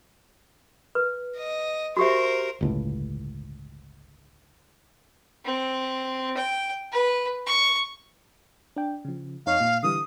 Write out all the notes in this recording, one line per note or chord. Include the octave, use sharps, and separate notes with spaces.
B4
D#5
F#4 G4 A#4 C5 E5
G1 C#2 A2
C4
G5
B4
C#6
D4 G5
C#3 F3
F2 D#4 C#5 F5
A#2
D3 E3 G3 D#6